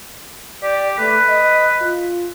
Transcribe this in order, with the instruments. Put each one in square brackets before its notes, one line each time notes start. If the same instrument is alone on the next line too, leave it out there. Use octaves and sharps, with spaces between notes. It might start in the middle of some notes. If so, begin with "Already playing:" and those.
[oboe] G4 [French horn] D5
[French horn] A3 [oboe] B4
[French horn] D#5
F4